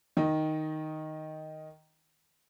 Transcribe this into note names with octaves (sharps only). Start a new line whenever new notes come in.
D#3 D#4